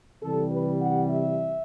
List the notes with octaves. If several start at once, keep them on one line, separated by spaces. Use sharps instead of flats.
C3 E3 G3 A4
B4
F#5
E5